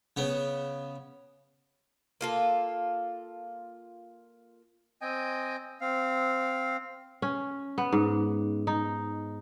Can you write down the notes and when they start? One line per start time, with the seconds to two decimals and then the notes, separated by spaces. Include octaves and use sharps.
0.17 C#3 B3
2.21 A#3 F4 A4
5.01 C4 D#5 G5 G#5
5.81 C4 F5
7.22 C#4
7.78 B3
7.93 G#2
8.67 D#4